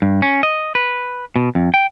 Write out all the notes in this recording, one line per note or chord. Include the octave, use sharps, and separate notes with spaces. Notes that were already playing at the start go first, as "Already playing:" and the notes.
G2
C#4
D#5
B4
B2
F2
G5